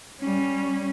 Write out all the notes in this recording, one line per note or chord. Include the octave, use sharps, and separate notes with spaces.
G3 C#4